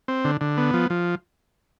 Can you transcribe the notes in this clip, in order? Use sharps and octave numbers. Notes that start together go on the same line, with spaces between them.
C4
D3
D3
B3
F3
F3